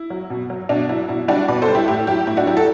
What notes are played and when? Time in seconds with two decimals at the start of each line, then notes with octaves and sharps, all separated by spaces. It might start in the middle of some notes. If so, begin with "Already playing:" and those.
Already playing: E4
0.10 F#3
0.30 B2
0.50 F#3
0.69 B2 D4
0.89 F#3 E4
1.08 B2 E4
1.28 G3 D4 F#4
1.48 B2 B4 D5
1.62 A4 C5
1.68 G3
1.75 E4 G4
1.88 A2 E4 G4
2.07 F#3 E4 G4
2.27 A2 E4
2.37 D4 F#4
2.47 F#3 E4 G4
2.57 F#4 A4